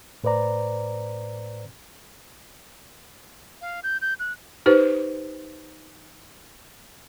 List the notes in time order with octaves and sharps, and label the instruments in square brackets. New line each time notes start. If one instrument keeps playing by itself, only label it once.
[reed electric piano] A2 B4 C5 D5 A#5
[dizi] F5
G6
G6
F#6
[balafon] D#4 G4 B4 C5